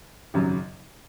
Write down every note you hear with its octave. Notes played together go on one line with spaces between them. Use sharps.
G#1 F#2 C#3 F#3